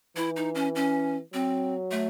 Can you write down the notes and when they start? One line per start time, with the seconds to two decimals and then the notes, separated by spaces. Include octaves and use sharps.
0.16 E3 E4
0.36 D#4
0.55 C#4
0.75 C#4
1.33 F#3 C4
1.91 A3